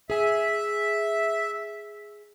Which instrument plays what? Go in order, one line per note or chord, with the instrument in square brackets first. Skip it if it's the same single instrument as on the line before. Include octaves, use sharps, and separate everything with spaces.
[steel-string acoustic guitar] G#4 G#5 [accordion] E5